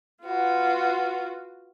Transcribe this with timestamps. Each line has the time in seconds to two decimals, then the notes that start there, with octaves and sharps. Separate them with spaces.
0.25 F4 F#4 B4